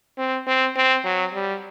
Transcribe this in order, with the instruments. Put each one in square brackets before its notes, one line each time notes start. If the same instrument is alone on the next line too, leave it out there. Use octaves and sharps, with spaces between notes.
[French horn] C4
C4
C4
F#3
G3